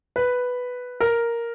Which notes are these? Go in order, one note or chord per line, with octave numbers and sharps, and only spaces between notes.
B4
A#4